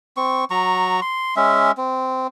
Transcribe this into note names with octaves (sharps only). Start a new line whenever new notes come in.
C4 C#6
F#3 A#5 C#6
C6
G#3 C#4 E5
C4